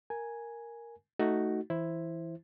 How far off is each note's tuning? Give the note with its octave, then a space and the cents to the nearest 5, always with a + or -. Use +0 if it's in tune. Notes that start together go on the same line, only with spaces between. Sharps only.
A#4 +0 G#5 +0
A3 +0 D#4 +0 F#4 +10
E3 +0 E4 +0 C5 +0